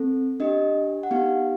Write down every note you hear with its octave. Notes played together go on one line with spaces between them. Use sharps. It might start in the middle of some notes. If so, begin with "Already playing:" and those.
Already playing: C4 A4
D4 G4 D#5
F#5
B3 D#4 G4 F5